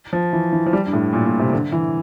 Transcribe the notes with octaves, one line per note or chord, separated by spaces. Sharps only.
F3
E3
E3
F3
G3
G2
A2
A#2
A#2
C3
D3
E3